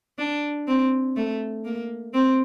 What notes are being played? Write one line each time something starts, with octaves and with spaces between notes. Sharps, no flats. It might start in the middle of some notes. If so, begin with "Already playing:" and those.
D4
C4
A3
A#3
C4